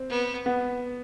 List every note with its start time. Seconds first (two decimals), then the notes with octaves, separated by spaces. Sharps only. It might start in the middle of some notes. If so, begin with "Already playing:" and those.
Already playing: C4
0.10 B3
0.46 B3